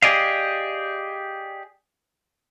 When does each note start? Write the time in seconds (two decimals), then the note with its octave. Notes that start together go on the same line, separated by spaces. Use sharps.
0.02 G4 G#4 D5 D#5 F5